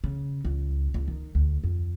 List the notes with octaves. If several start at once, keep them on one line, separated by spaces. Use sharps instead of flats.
C#3
C#2
C#2
D#3
D2
F2